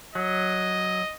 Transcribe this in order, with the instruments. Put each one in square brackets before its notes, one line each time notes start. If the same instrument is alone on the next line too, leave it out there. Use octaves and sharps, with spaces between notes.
[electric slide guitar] F#3 [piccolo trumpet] D#5